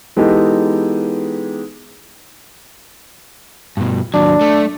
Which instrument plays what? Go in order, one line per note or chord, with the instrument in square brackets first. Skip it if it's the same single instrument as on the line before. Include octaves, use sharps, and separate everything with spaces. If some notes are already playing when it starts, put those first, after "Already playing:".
[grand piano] E3 G#3 B3 D#4 G4 A4
[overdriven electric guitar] G2 B2
[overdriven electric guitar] D#2 F#3 [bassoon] D4
[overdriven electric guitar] A3